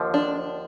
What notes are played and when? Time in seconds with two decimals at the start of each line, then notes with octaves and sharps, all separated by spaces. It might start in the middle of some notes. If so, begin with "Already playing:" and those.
Already playing: D#2 D3 F3
0.14 D4